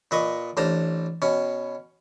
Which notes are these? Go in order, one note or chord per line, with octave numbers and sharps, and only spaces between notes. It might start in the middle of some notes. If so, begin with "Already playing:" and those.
A#2 B4 D#5 C#6
A1 D4 C5 A#5
B2 C#4